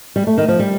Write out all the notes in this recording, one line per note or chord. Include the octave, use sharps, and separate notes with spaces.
G3
A3
D#3
F3
G3